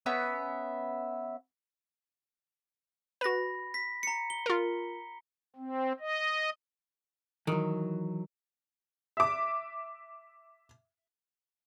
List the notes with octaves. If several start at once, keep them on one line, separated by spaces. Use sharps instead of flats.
B3 C#4 B4 E5
F#4 B4 B5 A#6
B6
A#5 C#7
G7
F4 A#4
C4
D#5
D#3 E3 F#3
E5 D6